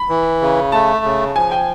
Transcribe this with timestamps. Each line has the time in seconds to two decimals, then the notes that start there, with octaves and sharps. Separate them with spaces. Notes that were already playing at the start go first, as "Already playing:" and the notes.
Already playing: B5
0.09 E3
0.41 C#3
0.72 A3 A5
1.04 C#3
1.35 F3 G#5
1.51 G5